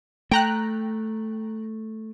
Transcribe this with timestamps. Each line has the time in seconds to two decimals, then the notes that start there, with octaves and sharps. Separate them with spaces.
0.31 A3 G5 A#5 F#6